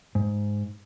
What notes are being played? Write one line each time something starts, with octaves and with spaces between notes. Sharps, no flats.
G#2